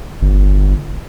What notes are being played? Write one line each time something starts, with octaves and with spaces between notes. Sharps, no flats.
G1